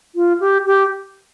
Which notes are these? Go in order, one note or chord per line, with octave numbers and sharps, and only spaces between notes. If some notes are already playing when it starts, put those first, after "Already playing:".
F4
G4
G4